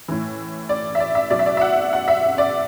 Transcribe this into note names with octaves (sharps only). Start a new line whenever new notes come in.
A2 E3
D5
E5
D5
E5
B2 F#3 D5
E5
D5
E5
F#5
F#5
E5
D5